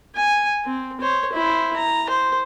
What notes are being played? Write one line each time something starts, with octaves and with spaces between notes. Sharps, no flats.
G#5
C4
C5 C#5
E4 C5
A#5
C5